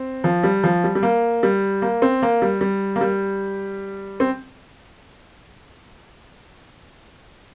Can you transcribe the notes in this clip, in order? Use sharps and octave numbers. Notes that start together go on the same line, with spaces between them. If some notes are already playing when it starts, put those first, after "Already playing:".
Already playing: C4
F3
G3
F3
G3
G3
A#3
G3
A#3
C4
A#3
G3
G3
A#3
G3
C4